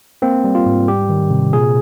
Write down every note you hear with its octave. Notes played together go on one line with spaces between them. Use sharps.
A#3 C4
G3
F4
G#2
G3 G4
D#3
C3
A#2 G#4